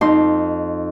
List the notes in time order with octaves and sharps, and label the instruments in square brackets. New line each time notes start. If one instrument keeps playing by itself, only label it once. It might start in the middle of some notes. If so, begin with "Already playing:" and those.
[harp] F2 D#4 C6